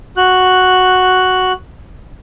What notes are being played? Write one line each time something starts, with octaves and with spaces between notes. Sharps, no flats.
F#4 F#6